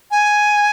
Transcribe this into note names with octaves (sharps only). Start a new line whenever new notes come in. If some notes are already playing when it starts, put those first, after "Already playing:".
G#5